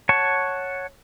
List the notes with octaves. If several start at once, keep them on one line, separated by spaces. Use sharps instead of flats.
C#5 F#5 A5 C#6